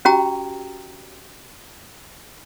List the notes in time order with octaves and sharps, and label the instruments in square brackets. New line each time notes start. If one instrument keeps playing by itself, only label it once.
[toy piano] C#4 F#4 G4 G5 A#5